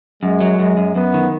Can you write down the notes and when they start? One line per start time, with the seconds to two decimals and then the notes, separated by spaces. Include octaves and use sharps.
0.23 F#2 G#3
0.40 F#3
0.59 F#2 G#3
0.77 F#2
0.95 F#2 B3
1.14 D#3